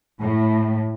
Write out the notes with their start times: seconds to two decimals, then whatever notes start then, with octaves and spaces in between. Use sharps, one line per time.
0.21 A2